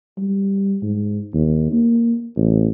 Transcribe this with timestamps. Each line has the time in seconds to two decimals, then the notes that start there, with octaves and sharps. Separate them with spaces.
0.18 G3
0.83 G#2
1.34 D#2
1.72 A#3
2.37 A1